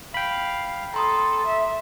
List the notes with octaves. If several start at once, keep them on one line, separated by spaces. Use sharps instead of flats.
F5 G5 B5
A4 A#5 C6 D#6
E5